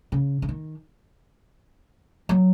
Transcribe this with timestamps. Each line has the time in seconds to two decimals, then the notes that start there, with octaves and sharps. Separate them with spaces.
0.12 C#3
0.42 C#3
0.49 D#3
2.29 F#3